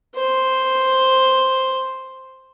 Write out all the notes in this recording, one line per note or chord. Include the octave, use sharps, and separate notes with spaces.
C5